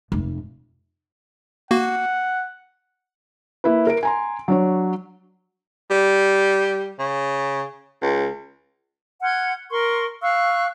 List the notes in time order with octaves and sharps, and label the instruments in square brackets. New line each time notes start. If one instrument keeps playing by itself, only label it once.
[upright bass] F1
[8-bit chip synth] A#3 F#4 [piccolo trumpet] F#5
[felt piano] A#3 E4 B4
A#4 D7
G#5 A#5 C6
F#3 D4 C#5
[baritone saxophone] G3
C#3
C#2
[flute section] F#5 C6 F6 G#6
A#4 C6 C#6
F5 C#6 E6 F#6